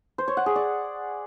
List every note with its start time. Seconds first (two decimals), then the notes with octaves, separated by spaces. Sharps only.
0.18 C5
0.28 C#5
0.37 F#5
0.46 G#4
0.55 D5